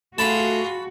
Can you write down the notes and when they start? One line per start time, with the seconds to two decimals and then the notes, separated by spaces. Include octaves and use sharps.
0.18 A3 F4 F#4 G#4 A5 B5